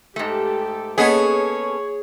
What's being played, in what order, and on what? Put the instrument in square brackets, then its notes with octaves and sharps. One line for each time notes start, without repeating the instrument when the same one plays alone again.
[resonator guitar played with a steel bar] G#2 A3 [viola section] G4 A4
[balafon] A#3 D#5 F#5 [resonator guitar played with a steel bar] B3 C#4 A4 [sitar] G#4 [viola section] C#5